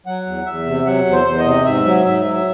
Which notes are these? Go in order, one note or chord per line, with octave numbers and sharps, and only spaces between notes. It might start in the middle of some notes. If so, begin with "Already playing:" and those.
F#3 F#5
E2
E2 E5
C3
F#3 F#5
E2
C5
E2
D#5
C3
G#2 E5
F#3
G#2 E5
F#3